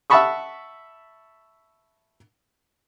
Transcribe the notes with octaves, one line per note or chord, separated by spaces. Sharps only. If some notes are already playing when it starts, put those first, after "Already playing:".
E5 F#5 A5 B5 C#6 D#6